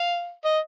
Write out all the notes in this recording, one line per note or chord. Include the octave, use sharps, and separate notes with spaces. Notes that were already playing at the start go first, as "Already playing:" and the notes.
Already playing: F5
D#5